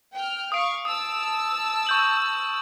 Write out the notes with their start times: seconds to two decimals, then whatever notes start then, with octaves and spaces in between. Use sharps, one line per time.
0.14 G5 F6
0.52 F5 C#6 D#6 D7
0.85 A5 D#6 E6
1.87 C#6 G6 F#7